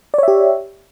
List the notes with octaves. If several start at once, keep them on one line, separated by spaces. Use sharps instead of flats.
G4 C#5 D5 E5